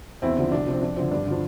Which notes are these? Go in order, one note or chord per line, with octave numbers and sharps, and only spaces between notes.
E2 C4 E4
D3 F3
C2 D4
C3 F3
C4
F2 D4
D3 F3 C4
G2 D4
D3
F3 D4